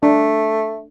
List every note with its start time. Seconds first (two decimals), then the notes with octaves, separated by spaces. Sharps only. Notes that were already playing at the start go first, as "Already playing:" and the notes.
0.03 A3 D4